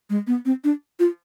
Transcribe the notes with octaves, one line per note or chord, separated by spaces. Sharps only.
G#3
B3
C4
D4
F4